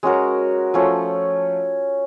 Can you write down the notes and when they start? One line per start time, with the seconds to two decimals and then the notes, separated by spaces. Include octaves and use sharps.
0.03 G#3 C#4 F#4 A#4
0.74 F3 A3 C#4